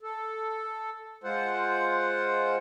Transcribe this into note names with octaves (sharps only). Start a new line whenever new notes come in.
A4
G#3 F4 C5 F#5